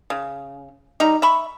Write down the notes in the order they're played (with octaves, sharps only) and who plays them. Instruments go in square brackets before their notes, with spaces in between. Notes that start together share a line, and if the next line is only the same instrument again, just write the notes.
[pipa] C#3
G3 D#4 A#5
E5 B5 C#6